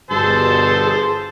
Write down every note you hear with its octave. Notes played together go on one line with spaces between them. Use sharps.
G1 G2 B2 G#4 A4 C5 A5 C6